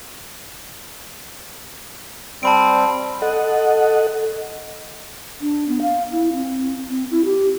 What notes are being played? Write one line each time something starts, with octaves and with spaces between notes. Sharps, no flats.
G3 C4 A5 B5 D7
A4 D#5 F#5
D4
B3
F5
E4
C4
C4
E4
G4